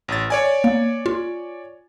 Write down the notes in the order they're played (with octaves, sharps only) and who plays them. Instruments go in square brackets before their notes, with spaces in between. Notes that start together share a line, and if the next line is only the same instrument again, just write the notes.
[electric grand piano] A1 A6
C#5 D5 G#5
[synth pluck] A#3
F4